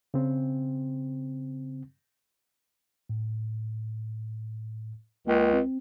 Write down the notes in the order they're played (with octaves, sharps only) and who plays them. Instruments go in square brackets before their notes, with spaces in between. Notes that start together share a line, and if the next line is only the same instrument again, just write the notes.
[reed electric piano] C#3 C4
[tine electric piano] A2
[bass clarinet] C#2 [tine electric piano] A#3 A#4 G5
[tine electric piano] C4